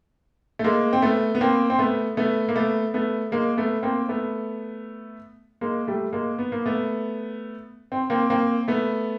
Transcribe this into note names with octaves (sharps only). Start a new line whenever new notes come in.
A3
G#3 A#3
C4
A3 B3
B3
A#3 C4
C4
A3 B3
A3 B3
A#3
A3 B3
A3 B3
G#3 A#3
A3 B3
A#3 C4
A3 B3
G#3 A#3
G3 A3
G#3 A#3
B3
A#3
A3 B3
C4
A#3 C4
A#3 C4
A3 B3